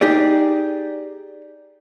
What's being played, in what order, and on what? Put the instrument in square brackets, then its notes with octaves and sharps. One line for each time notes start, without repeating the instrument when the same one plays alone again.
[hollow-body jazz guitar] D#4 G4 G#4 D5